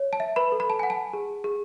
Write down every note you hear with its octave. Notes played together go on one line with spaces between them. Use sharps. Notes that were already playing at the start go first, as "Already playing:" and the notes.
Already playing: C#5
A5
E5
B4 B5
A4
B5
A5
F#5 G#5
A5
G#4
G#4